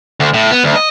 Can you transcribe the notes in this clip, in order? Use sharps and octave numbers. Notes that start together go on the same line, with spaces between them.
D2
A2
B3
D2
D#5